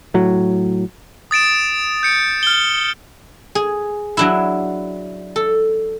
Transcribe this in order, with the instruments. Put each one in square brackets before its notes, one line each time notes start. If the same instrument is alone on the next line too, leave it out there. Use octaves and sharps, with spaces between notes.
[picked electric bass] A2 F#3
[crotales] D#6 A6 D7 E7
G6 C#7 D7
F6 G7
[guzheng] G#4
F#3 D4 E4
A4